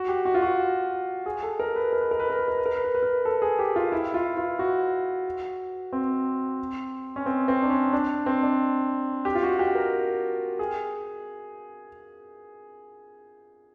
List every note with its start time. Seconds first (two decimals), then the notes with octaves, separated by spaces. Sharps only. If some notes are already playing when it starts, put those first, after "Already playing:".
Already playing: F#4
0.08 G4
0.25 F#4
0.34 F4
0.42 F#4
1.26 G#4
1.43 A4
1.60 A#4
1.76 B4
1.93 A#4
2.01 B4
2.11 A#4
2.20 B4
2.30 A#4
2.39 B4
2.48 A#4
2.58 B4
2.66 A#4
2.76 B4
2.85 A#4
2.95 B4
3.03 A#4
3.25 A4
3.42 G#4
3.59 G4
3.76 F4
3.92 E4
4.14 F4
4.37 F4
4.59 F#4
5.93 C4
7.16 C#4
7.26 C4
7.48 C4
7.63 D4
7.70 C#4
7.93 D4
8.26 C4
8.43 D4
9.25 G4
9.35 F4
9.43 F#4
9.59 G4
9.75 A#4
10.59 G#4